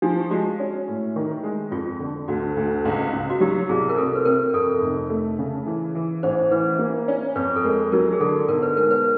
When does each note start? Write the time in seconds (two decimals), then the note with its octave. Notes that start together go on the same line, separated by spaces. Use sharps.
0.02 F3 D4
0.20 G4
0.31 G#3 F#4
0.60 C#4
0.88 A2
1.16 D#3
1.43 G#3
1.71 F2 F4
2.00 D3
2.28 D2 F#4
2.57 D2
2.85 C#2
3.13 C#2
3.30 F#4
3.40 F#3 G4
3.69 C2 G#4
3.89 A#4
3.98 C3 A4
4.16 B4
4.25 C3 A#4
4.54 F2 A4
4.82 F1
5.10 A3
5.39 C#3
5.66 E3
5.95 E3
6.23 A1 C5
6.51 E3 B4
6.79 A#3
7.08 C#4
7.36 F2 B4
7.56 A4
7.64 G#3 A#4
7.92 F#3 A#4
8.13 G#4
8.20 D3 A4
8.48 B1 A#4
8.63 B4
8.77 G#3 A#4
8.91 B4